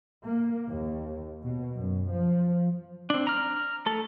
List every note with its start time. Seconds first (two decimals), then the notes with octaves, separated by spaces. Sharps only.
0.25 A#3
0.69 D#2
1.43 B2
1.75 F#2
2.11 F3
3.10 C4 D4
3.27 A#5 F6
3.86 A3 A4